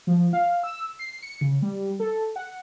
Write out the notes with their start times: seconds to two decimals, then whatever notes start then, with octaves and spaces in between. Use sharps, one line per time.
0.07 F3
0.33 F5
0.63 E6
0.99 C7
1.22 C#7
1.41 C#3
1.62 G3
2.00 A4
2.36 F#5